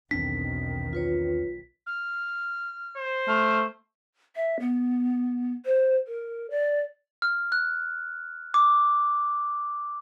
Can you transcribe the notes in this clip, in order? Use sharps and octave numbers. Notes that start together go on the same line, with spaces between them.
B1 E2 D#3 C4 D4 B6
F4 B4 C#5
F6
C5
A3 F6
E5
B3
C5
A#4
D5
F6
F#6
D6